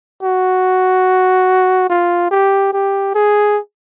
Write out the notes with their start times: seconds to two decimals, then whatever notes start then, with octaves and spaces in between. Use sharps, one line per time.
0.23 F#4
1.90 F4
2.31 G4
2.73 G4
3.15 G#4